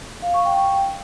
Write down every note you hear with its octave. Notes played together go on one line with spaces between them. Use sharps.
F5
C#6
G5